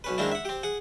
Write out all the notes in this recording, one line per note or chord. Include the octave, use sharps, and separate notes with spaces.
B1 C#4 B4
D#3 G#3 A#3 C4 D4 E4
E5 F#5
C4 G4
G#4 F#5